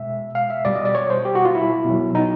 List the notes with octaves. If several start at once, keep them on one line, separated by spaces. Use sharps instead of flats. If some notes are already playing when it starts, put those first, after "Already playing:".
Already playing: B2 G#3 E5
F5
E5
B2 G3 D5
D#5
D5
C#5
C5
G4
F#4
F4
E4
B2 F#3
D#4